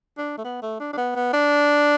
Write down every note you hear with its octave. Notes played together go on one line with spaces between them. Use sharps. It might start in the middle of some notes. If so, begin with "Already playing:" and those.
D4
A3
B3
A3
D4
D4
B3
B3
D4